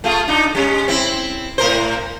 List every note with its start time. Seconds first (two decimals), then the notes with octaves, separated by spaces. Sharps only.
0.04 A3 F4 G#4
0.28 D4 D#4
0.55 G3 G#3 C#4
0.88 C4 E4
1.58 A2 A#4 C5